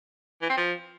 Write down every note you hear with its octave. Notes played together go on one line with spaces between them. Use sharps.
E3
C4
F3